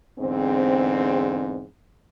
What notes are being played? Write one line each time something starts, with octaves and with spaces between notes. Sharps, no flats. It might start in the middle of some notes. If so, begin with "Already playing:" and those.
E2 G#2 D3 C4